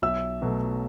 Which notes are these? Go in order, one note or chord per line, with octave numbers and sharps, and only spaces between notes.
B1 E5 E6
B2 F#3 A3